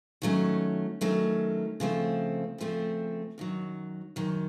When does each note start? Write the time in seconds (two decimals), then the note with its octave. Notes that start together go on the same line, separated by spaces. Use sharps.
0.22 D#3 F#3 A3 C#4
1.01 D#3 F#3 A3 C#4
1.80 C#3 F3 A3 C4
2.58 C#3 F3 A3 C4
3.38 F#2 D#3 F#3
4.16 F#2 D#3 F#3